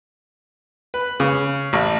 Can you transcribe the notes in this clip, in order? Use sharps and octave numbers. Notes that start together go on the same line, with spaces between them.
B4
C#3
A1